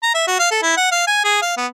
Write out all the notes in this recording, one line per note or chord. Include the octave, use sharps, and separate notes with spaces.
A#5
E5
F#4
F5
A4
E4
F#5
F5
G#5
G#4
F5
B3